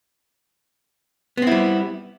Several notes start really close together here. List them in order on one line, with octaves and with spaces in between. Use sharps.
B3 C4 E4 G3